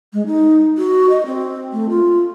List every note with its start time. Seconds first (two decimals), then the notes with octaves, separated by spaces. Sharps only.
0.13 G#3
0.26 D#4
0.78 F#4
1.10 D#5
1.26 C4
1.73 A3
1.90 F4